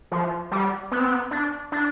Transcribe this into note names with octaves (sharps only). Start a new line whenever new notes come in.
F3
G3
B3
C4
B3
D4
D4